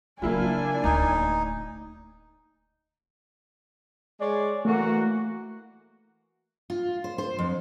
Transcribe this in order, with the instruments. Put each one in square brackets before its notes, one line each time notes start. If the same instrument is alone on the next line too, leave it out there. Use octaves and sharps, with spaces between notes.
[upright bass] C#3 F#3 [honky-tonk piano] A#3 E4 F4 [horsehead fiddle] D4 G#5
[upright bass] D1 D2 [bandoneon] D#4
[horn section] G#3 C#5 D5
[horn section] E3 A#3 F#4 [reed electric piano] A3
[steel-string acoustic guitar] F4
C5
C5
F2